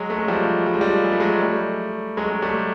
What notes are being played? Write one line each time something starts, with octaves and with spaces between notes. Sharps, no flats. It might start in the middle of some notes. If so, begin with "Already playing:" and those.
Already playing: F#3 G#3
A3
G#3
F3 G3
G3
G#3
F3 G3
G#3
A3
F#3 G#3
G3 A3
F#3 G#3
G#3
G3 A3